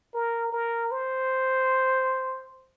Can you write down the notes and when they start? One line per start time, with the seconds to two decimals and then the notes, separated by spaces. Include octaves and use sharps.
0.14 A#4
0.52 A#4
0.91 C5